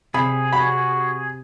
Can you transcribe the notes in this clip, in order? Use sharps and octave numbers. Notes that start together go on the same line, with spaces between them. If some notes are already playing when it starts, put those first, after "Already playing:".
C3 G#4 B5
F#4 B5